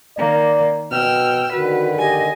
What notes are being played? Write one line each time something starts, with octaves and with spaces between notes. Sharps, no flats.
D#3 A#3 D5
B2 G5 E6 F6
D3 D#3 F#4 B4
G4 D#5 G#5